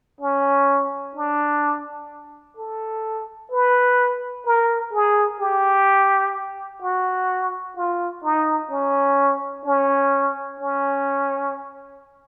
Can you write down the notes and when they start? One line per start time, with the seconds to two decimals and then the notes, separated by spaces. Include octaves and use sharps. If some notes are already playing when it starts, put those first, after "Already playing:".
0.21 C#4
1.15 D4
2.57 A4
3.51 B4
4.46 A#4
4.93 G#4
5.40 G4
6.82 F#4
7.76 F4
8.24 D#4
8.71 C#4
9.65 C#4
10.60 C#4